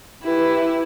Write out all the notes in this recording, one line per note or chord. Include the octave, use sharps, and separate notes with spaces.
E4 G4 B4